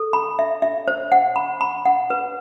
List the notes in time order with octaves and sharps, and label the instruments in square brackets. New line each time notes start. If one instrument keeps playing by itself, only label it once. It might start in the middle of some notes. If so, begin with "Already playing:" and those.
Already playing: [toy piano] A4
B5
E5
E5
C5
F#5
B5
B5
F#5
B4